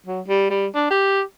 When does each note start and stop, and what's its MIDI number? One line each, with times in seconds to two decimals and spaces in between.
0.06 0.21 54
0.28 0.49 55
0.50 0.66 55
0.75 0.88 62
0.91 1.21 67